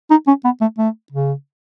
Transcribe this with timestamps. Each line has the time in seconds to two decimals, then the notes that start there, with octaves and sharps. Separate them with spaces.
0.10 D#4
0.27 C#4
0.44 B3
0.61 A3
0.78 A3
1.12 C#3